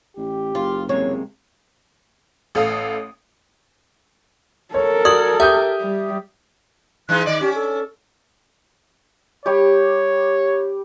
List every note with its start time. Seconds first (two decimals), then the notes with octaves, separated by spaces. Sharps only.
0.17 A1 G4
0.55 F#1 F4
0.89 C3 G#3 A#3 C#5
2.55 A1 A4 F5 D#6
4.74 A4 A#4 C#5
5.05 F#4 D5 D#6 G#6 F#7
5.40 G4 E5 D#6 G6
5.81 G3
7.09 E3 G#3 D#4 F#6
7.26 D#3 D5 D#5
7.41 C#4 G4
7.55 A4
9.46 G3 G4 C#5